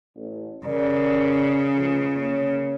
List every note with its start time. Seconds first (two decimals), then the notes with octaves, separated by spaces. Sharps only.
0.16 A1
0.66 C#3 A#4 D5
1.76 C#2 F3 A3
2.16 A#3 C#5